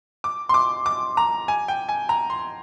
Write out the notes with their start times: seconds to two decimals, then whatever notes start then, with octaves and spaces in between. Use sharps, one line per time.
0.24 D6
0.49 C6
0.54 D6
0.86 D6
1.17 A#5
1.48 G#5
1.68 G5
1.89 G#5
2.09 A#5
2.30 C6